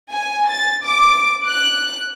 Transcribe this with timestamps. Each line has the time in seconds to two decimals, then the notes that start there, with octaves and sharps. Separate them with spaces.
0.11 G#5
0.48 A6
0.85 D6
1.46 F#6